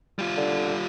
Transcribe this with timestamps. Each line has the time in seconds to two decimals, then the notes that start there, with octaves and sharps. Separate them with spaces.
0.19 G3 F4
0.38 D3